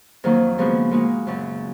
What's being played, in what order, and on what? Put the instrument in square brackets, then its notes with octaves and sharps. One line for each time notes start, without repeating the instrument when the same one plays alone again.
[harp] F2 D#3 F#3 A#3
C#3 F3 G#3 B3 F#4
A#2 G#3 D#4 F#4
F#2 C#3 F#3